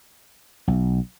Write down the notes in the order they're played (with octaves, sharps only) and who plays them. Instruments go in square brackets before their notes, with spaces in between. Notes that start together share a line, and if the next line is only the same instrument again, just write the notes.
[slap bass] B1